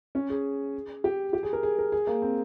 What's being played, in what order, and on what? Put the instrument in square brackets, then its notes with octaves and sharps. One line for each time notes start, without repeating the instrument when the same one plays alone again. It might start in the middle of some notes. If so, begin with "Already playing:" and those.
[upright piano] C#4
G#4
G4
G4
G#4
A#4
G#4
A#4
G#4
A#3
C4